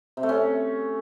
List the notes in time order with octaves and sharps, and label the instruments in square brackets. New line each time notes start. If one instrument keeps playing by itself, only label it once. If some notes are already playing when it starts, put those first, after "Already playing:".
[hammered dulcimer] C3
A3
C#4